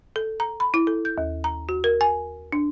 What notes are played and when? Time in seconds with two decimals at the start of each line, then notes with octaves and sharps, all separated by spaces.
0.16 A4
0.40 A#5
0.60 B5
0.74 E4
0.87 A4
1.05 G6
1.18 D#2
1.44 A#5
1.69 F#4
1.84 A#4
2.01 G#5
2.52 D4